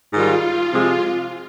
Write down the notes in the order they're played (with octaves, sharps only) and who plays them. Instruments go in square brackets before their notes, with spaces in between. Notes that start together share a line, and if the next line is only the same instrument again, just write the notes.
[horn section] G#2 D#3 G3 [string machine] F4
[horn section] C3 F3 G#3 [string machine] F4